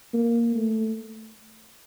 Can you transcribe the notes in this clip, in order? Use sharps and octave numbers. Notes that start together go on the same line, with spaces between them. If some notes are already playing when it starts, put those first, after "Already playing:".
A#3
A3